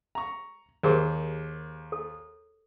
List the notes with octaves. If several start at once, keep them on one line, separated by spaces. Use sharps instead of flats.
A#5 C#6
D#2 G4 G#4 A#4 C5
A4